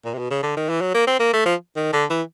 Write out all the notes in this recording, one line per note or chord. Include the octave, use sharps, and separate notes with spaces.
A#2
C3
B2
C#3
D3
D#3
E3
F#3
A#3
C4
A#3
A3
F3
D#3
D3
E3